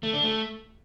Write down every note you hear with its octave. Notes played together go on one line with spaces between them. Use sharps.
A3
D4
A3